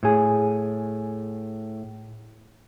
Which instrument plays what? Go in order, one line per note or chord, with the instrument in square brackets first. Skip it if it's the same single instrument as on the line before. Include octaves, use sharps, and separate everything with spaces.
[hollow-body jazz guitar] A2 G#4